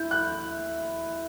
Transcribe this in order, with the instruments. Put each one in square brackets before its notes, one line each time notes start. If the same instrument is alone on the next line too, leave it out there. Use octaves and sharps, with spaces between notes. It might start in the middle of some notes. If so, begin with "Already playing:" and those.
Already playing: [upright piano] E4 [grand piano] G6
[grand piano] F#6